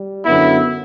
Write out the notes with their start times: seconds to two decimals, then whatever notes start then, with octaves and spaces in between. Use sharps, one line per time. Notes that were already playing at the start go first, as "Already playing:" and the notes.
Already playing: G3
0.25 F#2 D3 F#3 B3 E4